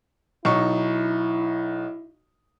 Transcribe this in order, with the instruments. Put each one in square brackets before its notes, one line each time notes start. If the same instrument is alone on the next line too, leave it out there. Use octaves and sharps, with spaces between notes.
[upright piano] B1 D#4 C#6 [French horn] E4